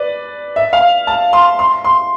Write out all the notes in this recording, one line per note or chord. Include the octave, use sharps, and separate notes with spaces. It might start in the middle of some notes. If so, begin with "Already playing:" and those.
Already playing: B4 D5
E5
F5
A5
C6
C6
C6